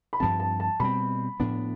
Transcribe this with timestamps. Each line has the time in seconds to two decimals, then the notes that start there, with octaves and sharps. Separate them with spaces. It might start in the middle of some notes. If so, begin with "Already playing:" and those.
0.13 B5
0.20 G2 F3 C4 A5
0.40 A5
0.60 A5
0.80 B2 G3 C4 B5
1.40 A2 F3 B3 D4